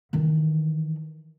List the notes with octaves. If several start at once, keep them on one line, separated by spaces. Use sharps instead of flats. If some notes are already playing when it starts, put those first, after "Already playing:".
D#3 E3